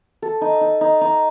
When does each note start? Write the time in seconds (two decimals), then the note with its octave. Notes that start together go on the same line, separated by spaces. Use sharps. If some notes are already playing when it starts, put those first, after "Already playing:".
0.22 A4
0.41 D#4
0.61 D#4
0.81 D#4
1.01 D#4